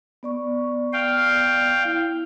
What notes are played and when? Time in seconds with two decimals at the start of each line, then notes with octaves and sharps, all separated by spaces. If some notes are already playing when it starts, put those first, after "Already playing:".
0.23 B3 D5 C#6
0.93 F5 G5
1.85 E4